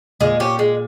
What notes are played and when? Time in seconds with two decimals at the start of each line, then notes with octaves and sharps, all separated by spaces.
0.21 A#2 G#3
0.40 C#4 G4
0.59 G#3